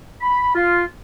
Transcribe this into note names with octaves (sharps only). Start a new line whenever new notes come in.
B5
F4